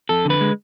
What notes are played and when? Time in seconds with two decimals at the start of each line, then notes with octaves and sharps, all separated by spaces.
0.09 F2 A4
0.25 D3 B4
0.41 G#3